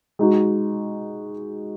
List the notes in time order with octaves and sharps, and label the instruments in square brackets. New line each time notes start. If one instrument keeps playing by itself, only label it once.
[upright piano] G#3 D#4 F#4